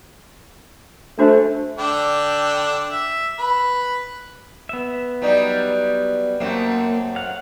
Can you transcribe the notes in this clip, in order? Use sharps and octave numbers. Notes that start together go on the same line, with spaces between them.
A3 D4 F#4 C5
D3 D4 G5
E5
B4
B3 E5
F#3 G3 D#4
F#2 A3 A#3 C4
F5 F#5